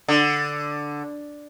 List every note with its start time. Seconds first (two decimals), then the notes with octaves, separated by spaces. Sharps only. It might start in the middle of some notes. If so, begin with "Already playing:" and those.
0.08 D3